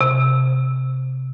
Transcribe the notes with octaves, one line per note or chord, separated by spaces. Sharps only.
C3